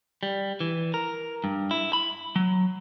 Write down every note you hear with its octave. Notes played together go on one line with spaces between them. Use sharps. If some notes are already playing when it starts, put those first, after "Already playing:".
G3
E3
A#4
G2
E4
B5
F#3